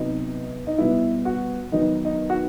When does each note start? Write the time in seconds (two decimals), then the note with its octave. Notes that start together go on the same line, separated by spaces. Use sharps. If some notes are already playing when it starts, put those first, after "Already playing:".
Already playing: C3 F#3 B3 D#4
0.67 D#4
0.78 B2 G3 B3 E4
1.25 F#4
1.72 D#3 F#3 B3 D#4
2.05 D#4
2.30 F#4